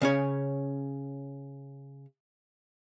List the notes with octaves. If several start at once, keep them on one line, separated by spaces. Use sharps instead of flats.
C#3 C#4 C#5